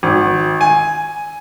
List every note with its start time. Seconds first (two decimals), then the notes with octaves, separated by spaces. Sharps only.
0.03 G#1
0.61 G#5